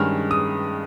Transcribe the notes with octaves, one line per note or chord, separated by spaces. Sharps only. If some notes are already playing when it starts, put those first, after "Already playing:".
Already playing: G2 D#3 G#3 C#4 F6
D#6